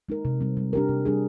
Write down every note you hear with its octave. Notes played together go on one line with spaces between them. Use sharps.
G#3 D#4 A#4
C3
G3 C4
G3
D4 G4 A#4
C3
G3 D4 G#4